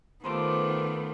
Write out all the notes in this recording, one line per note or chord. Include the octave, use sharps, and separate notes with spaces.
D#3 A3 B3 F4 C5 C6 D6